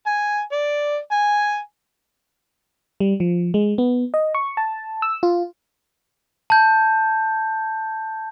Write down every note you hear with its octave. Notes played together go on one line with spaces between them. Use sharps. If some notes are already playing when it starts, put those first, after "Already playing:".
G#5
D5
G#5
G3
F3
G#3
B3
D#5
C#6
A5
E6
F4
A5 G6